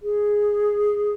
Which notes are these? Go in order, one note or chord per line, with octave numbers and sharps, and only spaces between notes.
G#4